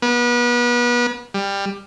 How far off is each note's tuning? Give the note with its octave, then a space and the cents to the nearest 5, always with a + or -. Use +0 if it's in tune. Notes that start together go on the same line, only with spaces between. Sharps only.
B3 -35
G3 +15